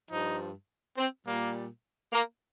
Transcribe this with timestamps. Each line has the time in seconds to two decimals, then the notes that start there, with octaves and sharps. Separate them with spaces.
0.11 G2 F3 D#4
0.97 C4
1.26 A#2 G3 A#3
2.12 A#3